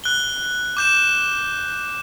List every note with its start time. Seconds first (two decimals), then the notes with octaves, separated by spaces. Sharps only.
0.04 F#6 G7
0.77 D6 G6 E7